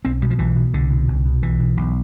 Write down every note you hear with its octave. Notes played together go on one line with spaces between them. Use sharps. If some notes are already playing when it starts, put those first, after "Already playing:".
B1 C4
B2 G3
F3
B1 E3
B2
C2 D3
B2
C2
B2
B1 E3
B2
B1